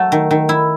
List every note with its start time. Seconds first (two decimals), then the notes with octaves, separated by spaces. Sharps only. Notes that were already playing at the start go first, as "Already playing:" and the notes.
Already playing: F#3 A3
0.12 D#3
0.31 D#3
0.49 E4